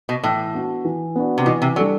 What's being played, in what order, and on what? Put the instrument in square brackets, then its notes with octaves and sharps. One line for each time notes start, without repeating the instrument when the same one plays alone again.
[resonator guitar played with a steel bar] B2
[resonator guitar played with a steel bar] A2 [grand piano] E3
[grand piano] B3 D4 F#4
E3
B3 D4 F#4
[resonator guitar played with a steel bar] C3
[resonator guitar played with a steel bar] B2 [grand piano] E3
[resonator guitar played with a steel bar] C3
[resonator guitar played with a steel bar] F#3 [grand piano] G3 D4 A4 D5